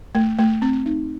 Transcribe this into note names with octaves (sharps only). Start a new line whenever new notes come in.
A3
A3
C4
D#4